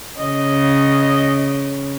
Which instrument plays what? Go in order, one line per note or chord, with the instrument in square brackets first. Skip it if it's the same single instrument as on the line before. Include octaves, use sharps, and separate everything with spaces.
[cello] C#3 [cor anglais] D#5